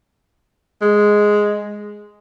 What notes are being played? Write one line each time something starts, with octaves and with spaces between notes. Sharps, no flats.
G#3